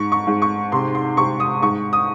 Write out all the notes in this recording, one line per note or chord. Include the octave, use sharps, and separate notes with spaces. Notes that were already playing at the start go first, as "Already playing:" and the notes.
Already playing: G#2 C#6
C#6
G#2
C#6
C3 C6
C6
C3 C#6
D#6
G#2 C#6
D#6